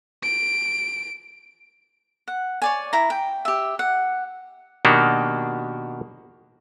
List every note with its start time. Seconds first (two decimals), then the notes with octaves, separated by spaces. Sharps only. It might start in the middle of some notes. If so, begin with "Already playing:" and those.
0.23 D7
2.28 F#5
2.62 C#5 D5 G#5
2.93 E4 A#5
3.10 G5
3.45 G4 E5
3.79 F#5
4.85 B2 D#3 A#3 D4 F#4 G4